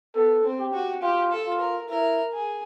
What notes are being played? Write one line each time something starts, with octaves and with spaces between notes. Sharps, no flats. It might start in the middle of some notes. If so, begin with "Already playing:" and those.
B3 A4
C4
G4
F#4
F4 G4
A4
F4
A#4
E4 A#4
G#4